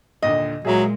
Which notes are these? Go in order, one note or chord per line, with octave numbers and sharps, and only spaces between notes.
D#2 A#2 D3 D#5
A#2 F#3 G#3 G#4 E5 A#5